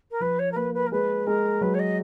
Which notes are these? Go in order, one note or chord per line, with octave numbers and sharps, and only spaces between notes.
A#4
F3 B4
C#5
A#4
A#3 B4
B4
A#4
G#3 B4
G#3 A#4
F#3 B4
C#5
D#5